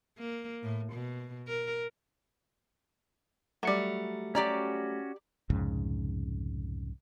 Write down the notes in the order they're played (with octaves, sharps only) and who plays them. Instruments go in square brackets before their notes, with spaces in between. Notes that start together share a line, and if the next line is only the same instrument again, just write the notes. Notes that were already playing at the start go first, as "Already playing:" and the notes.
[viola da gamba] A#3
A2
B2
A#4
[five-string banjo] F#3 G3 [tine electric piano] A3 C#7
[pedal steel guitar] C#4 F#4 [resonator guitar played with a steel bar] G4 D5 A#5
[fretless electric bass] C2 F2 G#2 C#3